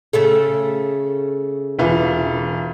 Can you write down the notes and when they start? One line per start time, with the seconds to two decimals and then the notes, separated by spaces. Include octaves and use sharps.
0.13 C#3 A3 A4
1.79 E1 E3 F4